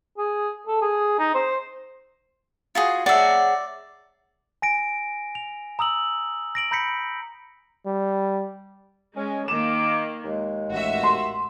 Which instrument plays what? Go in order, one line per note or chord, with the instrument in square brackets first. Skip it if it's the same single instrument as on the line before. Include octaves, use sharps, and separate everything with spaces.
[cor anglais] G#4
A4
G#4
D#4
C5
[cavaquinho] F4 F#4 G#4
[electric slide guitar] G#4 C#5 F#5 [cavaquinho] D5 E5
[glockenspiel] G#5 A#6 D7
F7
A#5 D#6 E6 F#7
A#6 D7 F#7
A#5 B5 G6 A#6 B6 C#7
[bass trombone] G3
[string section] G#3 [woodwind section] C#4
[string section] D#3 A#3 [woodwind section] D6 [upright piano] E7
[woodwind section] D#2 G#3
[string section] A1 F#4 E5
[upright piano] C6